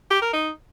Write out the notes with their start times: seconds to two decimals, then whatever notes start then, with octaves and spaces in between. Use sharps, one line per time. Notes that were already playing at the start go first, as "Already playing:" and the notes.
0.11 G4
0.22 A#4
0.33 D#4